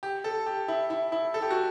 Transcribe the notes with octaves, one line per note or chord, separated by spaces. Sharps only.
G4
A4
G4
E4
E4
E4
A4
G4
F#4